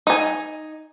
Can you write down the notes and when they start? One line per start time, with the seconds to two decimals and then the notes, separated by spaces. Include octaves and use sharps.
0.07 D#4 G#5